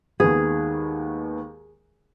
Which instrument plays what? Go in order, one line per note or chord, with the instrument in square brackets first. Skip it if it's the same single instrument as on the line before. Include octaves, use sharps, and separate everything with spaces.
[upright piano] D#2 D#3 G#3 B3 [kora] G#4